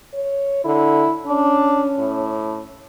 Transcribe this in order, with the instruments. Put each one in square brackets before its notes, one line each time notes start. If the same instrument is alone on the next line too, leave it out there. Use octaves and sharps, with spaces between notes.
[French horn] C#5
[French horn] D3 [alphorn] E4
[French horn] C#4 [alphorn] D4
[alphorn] A2